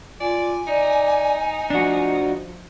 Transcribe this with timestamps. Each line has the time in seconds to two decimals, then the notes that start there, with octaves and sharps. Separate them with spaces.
0.20 F4 D5 G#5
0.67 D#4 D5
1.70 F3 D4 F#4